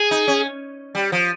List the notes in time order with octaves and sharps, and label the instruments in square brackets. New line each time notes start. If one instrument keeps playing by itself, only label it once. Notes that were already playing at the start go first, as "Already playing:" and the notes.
Already playing: [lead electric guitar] G#4
[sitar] D#4
C#4
G3
F3